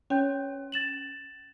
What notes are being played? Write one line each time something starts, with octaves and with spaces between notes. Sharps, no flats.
C#4 C#5 G5 G6
A6 E7 F#7